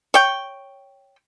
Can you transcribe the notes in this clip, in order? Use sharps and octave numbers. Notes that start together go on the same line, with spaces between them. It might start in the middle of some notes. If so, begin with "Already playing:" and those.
C#5 G5